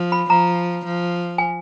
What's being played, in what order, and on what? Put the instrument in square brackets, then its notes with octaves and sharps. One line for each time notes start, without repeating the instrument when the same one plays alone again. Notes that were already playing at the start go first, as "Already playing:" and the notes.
Already playing: [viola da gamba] F3
[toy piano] B5
[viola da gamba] F3 [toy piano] A#5
[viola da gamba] F3
[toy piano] G#5